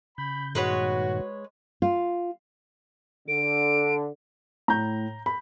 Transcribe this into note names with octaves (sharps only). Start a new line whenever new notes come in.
C#3 B5 G6
G2 A#2 D#3 G#3 F#4 B4 C#5
F4
D3 D7
A2 A#5 G6
B5